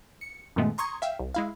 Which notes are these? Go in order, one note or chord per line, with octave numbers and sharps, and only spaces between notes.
C#7
F#2 A#2 D#3 G#3 A3 B3
A#5 C6 C#6 D#6 G#6
E5 F5 G5
C2
G#3 E4 F5